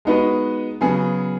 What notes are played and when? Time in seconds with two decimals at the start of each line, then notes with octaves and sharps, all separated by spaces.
0.05 G#3 B3 D#4 F#4 B4
0.81 C#3 F#3 B3 G#4